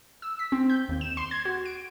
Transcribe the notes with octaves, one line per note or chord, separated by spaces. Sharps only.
E6
B6
C4
G6
D#2
E7
C6
G#6
F#4
D7